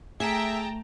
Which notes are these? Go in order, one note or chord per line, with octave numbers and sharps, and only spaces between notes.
A3 G#4 E5 G5 A5 A#5